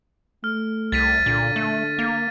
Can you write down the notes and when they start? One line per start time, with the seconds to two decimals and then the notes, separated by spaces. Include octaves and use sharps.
0.44 A3 F6
0.92 C2 A6 B6 D#7
1.26 A#2 D3
1.56 A3
1.99 A#3